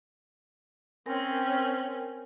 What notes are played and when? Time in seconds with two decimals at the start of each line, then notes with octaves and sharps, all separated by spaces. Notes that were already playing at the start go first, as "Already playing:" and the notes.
1.06 C4 C#4 A#4 G#5